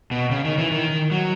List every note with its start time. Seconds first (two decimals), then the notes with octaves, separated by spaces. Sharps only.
0.11 B2
0.31 C#3
0.45 D#3
0.58 E3
0.71 D#3
1.11 F#3